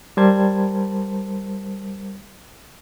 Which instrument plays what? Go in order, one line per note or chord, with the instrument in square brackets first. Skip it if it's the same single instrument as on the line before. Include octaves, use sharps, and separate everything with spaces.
[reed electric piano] G3 A#4 C5 A5 G#6